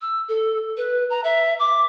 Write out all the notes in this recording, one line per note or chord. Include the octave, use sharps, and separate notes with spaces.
E6
A4
B4
A#5
E5
D6